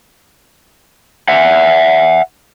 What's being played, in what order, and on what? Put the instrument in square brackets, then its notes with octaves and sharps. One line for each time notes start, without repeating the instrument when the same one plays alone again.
[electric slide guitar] E5 F#5